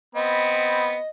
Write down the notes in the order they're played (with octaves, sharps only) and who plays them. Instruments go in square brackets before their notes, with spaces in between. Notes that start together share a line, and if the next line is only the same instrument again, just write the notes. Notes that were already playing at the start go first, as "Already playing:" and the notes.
[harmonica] B3 C4 B5 [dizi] D#5